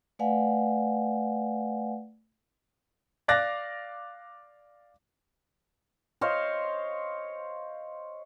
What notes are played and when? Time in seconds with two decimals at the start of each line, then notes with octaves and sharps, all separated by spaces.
0.19 A3 B4 D5 F5 F#5 G#5
3.28 D5 F5 D6 F#6 A6 A#6
6.21 C5 C#5 D#5 F5